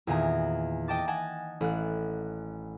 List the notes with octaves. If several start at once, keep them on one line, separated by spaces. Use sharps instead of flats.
E2 A#2 D#3 G#5 A#5
D#5 G5 A5 D6 A6
D#5 F#5 G#5 A5
A1 F#6